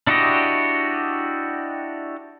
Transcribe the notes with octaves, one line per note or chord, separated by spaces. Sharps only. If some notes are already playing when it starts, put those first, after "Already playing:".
D4 E4 F#4 G4 D#5